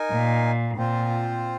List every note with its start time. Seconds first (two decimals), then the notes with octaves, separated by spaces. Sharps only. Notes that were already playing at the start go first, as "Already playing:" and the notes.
Already playing: D#4 A#4 G#5
0.12 A#2
0.77 A#2 C4 F4 C5